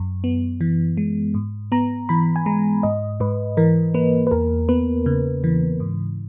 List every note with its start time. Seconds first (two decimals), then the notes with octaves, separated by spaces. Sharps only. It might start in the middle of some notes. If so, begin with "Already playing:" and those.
Already playing: F#2
0.24 B3
0.61 E3
0.97 G#3
1.34 G#2
1.72 B3 A#5
2.09 E3 B5
2.36 G#5
2.46 G#3 A#5
2.83 G#2 D#5
3.20 G#2 B4
3.57 E3 A#4
3.94 A#3 B4
4.27 B4
4.31 E2 A#4
4.69 B3 B4
5.06 C#3
5.44 E3
5.80 G#2